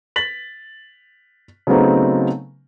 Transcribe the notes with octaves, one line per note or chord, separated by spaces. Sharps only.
A6 B6 F#7
C#3 F#3 A3 B3 C4 D#4